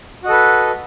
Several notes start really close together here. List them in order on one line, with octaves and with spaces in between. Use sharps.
F#4 D#5 A4 B4